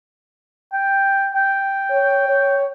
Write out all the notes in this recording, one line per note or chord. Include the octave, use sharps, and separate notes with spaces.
G5
G5
C#5
C#5